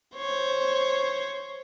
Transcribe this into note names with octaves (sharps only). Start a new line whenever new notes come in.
C5 C#5